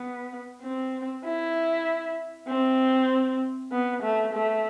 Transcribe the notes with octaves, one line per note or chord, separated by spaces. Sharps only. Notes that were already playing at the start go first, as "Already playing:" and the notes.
Already playing: B3
C4
E4
C4
B3
A3
A3